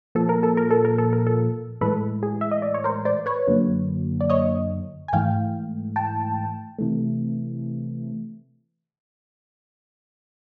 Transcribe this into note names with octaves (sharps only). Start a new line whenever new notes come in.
A#2 F3 A#3 A4
A#4
A4
A#4
A4
A#4
A4
A#4
A4
A2 E3 G#3 A4 B4
G#4
E5
D#5
D5
C#5
A#4 C5
C5 D5
B4 C#5
F#2 D3 F#3 A#3
D5
C#5 D#5
G#5
G#2 E3 A3 F5 G5
G5 A5
C3 E3 A3